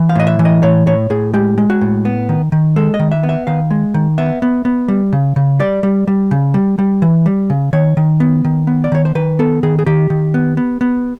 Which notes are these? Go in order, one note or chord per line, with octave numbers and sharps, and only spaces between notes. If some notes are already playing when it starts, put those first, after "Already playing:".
Already playing: E3
F5
A2 D#5
E5
E3
D#5
A2 C#5
A2 C#5
A2 G#4
G#3 G4
G#3
F#4
A2
B3
D#3
D#3
G#3 A4
D#5
D#3
E5
B3
E5
D#3 F5
G#3
D#3
B3 E5
B3
B3
G3
C#3
C#3
G3 D5
G3
G3
C#3
G3
G3
E3
G3
C#3
D#3 C#5
D#3
B3
D#3
B3
D5
D#3 C#5
C5
D#3 B4
B3 A4
D#3 G#4
G#4
D#3 G4
D#3
B3
B3
B3